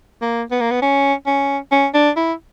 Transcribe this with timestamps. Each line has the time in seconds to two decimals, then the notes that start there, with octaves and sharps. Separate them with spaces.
0.22 A#3
0.51 B3
0.61 A#3
0.71 B3
0.82 C#4
1.27 C#4
1.72 C#4
1.94 D4
2.17 E4